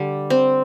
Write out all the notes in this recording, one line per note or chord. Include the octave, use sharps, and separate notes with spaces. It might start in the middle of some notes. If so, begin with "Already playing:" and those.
Already playing: D3 G3
C4